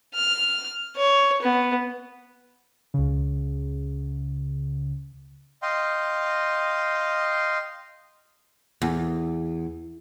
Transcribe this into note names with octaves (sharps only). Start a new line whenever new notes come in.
F6
C#5
B3
C#2 C#3
D#5 F5 G5 C6
E2